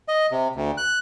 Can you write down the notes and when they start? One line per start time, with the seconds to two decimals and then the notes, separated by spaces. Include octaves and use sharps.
0.08 D#5
0.31 C3
0.55 D2
0.78 F#6